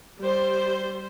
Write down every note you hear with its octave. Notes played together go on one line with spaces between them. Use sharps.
G3 C5